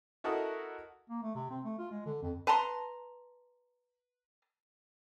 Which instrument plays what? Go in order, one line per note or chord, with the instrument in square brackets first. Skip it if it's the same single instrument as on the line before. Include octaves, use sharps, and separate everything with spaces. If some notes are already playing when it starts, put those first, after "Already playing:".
[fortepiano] E4 F#4 A4 A#4 D#5 D#6
[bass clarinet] A#3
A3
C3
C4
A3
F4
G#3
D3
F2
[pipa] B4 A5 A#5 C6